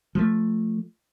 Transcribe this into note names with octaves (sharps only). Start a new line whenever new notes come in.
F3 A3